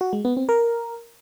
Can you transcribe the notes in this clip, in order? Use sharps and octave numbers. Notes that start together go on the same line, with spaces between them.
F#4
G#3
B3
C4
A#4